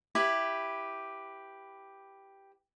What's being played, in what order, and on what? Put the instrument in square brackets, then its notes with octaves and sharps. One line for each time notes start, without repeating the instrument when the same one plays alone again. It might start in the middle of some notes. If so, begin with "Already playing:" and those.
[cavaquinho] E4 G4 B4